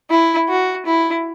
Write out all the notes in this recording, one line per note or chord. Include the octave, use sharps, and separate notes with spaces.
E4
F#4
E4